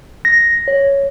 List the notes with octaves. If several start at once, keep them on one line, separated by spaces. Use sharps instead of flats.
A#6
C#5